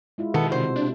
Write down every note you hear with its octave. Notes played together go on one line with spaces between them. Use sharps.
G#3 E4 F4
B2 D#3 B3 A4
C3 C5
D4